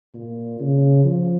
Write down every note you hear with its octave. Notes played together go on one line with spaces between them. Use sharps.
A#2
C#3
F3